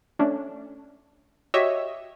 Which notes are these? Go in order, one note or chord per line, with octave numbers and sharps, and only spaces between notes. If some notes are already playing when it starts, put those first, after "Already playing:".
A3 C#4 D4
F#4 G4 C#5 D#5 E5